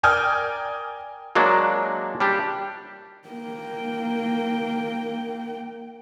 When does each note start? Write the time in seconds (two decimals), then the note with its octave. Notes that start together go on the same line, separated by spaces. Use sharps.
0.03 A#4 D5 G5 G#5 D#6 F6
1.35 F#3 G#3 A#3 D4 F#4
2.20 G3 D4 G4
3.28 A#3 G5